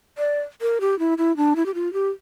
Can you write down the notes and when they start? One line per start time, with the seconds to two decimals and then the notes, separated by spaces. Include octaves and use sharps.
0.18 D5
0.61 A#4
0.81 G4
0.99 E4
1.18 E4
1.37 D4
1.56 E4
1.66 G4
1.74 F4
1.93 G4